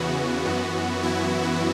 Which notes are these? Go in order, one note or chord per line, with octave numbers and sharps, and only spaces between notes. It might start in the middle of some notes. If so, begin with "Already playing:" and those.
Already playing: E2 C#3 E3 B3 F#4
F#2 E3 B3
E4